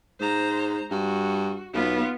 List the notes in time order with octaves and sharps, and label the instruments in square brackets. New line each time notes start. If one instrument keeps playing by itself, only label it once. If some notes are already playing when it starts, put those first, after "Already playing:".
[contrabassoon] G#2 [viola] C5 A#5
[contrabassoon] G2 [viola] F#4
[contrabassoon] B1 [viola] B3 F4